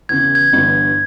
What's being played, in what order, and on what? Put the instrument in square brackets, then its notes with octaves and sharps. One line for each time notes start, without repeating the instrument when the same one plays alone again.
[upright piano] E2 C#3 E3 [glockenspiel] G#6
[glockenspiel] G#6
[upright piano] G1 G2 E3